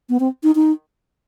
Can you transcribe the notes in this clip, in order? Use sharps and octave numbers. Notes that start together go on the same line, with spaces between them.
B3
C4
D#4
D#4